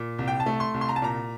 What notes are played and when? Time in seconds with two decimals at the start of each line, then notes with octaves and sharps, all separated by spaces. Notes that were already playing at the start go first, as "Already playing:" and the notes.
Already playing: A#2
0.19 C2
0.28 G5
0.40 A5
0.46 A3
0.60 C6
0.74 C2
0.81 C6
0.89 A#5
0.96 A5
1.02 A#2 A#5